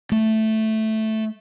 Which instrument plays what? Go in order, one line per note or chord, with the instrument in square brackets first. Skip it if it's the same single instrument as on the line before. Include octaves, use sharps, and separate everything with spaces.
[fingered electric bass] A3